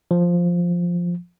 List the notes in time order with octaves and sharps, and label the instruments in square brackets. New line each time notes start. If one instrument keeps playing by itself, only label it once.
[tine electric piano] F3